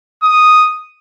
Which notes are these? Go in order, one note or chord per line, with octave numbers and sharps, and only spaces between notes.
D#6